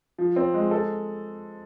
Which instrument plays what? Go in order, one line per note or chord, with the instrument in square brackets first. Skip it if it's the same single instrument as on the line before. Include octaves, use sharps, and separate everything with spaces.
[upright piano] F3
C4
G#3
A4